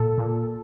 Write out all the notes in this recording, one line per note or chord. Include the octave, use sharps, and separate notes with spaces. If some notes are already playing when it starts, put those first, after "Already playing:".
Already playing: A#2 A4
A#2